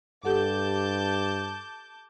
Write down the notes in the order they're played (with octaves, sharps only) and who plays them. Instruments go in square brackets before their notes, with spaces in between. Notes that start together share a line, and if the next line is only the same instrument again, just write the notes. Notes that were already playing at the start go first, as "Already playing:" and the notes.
[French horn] G2 [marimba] G4 A4 F#5 [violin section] A5 D6 G6